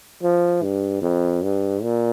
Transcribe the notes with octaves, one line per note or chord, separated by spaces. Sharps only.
F3
G2
F2
G2
A#2